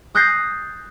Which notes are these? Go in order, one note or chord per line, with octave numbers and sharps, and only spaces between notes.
D#6 F#6 G6 A6 A#6 C7